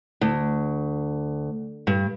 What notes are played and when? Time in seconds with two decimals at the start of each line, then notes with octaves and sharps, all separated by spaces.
0.21 D2
1.87 G2